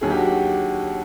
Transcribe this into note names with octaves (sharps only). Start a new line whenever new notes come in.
D#2 D3 F#3 G#4
G4
F#4
G4